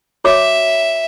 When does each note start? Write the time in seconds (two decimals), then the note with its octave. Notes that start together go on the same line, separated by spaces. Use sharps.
0.24 F#4 C#5 E5 D6